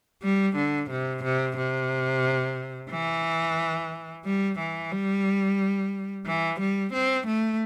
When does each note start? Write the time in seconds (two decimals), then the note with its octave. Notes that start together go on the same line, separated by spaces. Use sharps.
0.23 G3
0.56 D3
0.90 C3
1.24 C3
1.57 C3
2.91 E3
4.25 G3
4.59 E3
4.92 G3
6.26 E3
6.60 G3
6.93 C4
7.27 A3